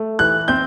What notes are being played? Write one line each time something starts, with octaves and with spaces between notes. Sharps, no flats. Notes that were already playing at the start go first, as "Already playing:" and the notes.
Already playing: A3
E3 F#6
C4 G6